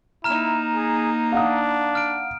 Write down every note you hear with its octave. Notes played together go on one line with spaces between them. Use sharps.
A#3 D#4 E4 A#5 F6 E7
G#4
D4 F5 F#5 D#6
F6 D7